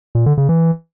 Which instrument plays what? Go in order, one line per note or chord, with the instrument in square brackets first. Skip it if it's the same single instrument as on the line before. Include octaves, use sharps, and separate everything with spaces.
[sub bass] A#2
D3
C#3
E3